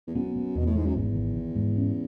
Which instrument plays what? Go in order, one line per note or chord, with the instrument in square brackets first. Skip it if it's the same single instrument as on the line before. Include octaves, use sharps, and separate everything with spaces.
[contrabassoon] E2
[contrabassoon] F#2 [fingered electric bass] B3
[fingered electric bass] B3
[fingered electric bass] E2 [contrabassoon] B2
[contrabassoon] A2
[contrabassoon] G#2 [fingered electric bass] G#3
[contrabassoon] F#2
[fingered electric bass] G#1 [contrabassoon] E2
[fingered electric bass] D#3
D#3
G#2
C#4